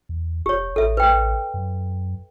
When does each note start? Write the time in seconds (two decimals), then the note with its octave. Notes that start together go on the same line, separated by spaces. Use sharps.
0.09 E2
0.46 F1 G4 C#5
0.76 A1 A4 E5
0.97 B4 G5
1.54 F#2